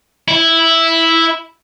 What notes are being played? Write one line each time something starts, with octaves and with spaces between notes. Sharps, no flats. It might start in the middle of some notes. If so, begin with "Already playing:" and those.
E4